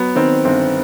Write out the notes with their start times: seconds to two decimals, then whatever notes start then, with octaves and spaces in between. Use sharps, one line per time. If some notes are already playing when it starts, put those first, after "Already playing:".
Already playing: F#3 B3
0.16 D#3 C4
0.45 G1 C4